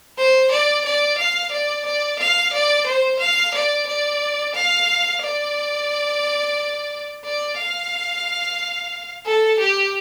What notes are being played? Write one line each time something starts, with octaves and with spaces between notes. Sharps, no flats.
C5
D5
D5
F5
D5
D5
F5
D5
C5
F5
D5
D5
F5
D5
D5
F5
A4
G4